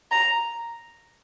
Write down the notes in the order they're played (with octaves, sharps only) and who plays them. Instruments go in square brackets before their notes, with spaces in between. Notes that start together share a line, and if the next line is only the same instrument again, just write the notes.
[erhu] A#5